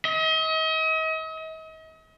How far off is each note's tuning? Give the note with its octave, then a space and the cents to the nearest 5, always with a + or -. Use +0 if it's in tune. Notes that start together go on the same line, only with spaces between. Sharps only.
D#5 +40